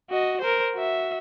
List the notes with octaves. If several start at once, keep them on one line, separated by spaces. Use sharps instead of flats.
F#4 D#5
A#4 C5
F#4 E5